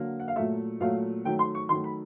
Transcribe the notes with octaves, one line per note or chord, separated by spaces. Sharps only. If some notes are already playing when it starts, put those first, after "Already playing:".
Already playing: D3 F#3 A#3
F#5
F5
A#2 F#3 A3 E5
A#2 F#3 A3 F5
D#3 F#3 A3 G5
C6
C#6
D#3 F#3 A3 C6
B5